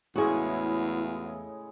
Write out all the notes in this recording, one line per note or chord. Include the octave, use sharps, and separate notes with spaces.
E2 A2 C#3 G#3 E4 F#4 G#4